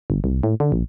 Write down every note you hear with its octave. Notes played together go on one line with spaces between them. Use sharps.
G1
C2
A2
D3
A#1